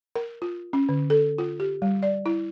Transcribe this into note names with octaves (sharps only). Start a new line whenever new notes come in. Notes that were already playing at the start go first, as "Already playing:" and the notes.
A#4
F4
C#4
D3
A4
F4
G4
G3
D5
E4